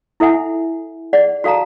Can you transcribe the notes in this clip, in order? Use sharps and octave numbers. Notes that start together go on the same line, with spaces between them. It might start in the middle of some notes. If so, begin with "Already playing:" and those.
E4 A4 E5 F#5 G#5
G#4 D5 F#5
F#4 A4 F5 A5 A#5